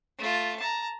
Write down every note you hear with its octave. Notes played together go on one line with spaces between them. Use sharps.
A3 F4
A5 A#5